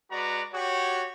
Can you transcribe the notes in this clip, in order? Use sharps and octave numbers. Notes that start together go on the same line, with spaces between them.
G#3 F#4 B4 D5 A#5
F#4 G4 C#5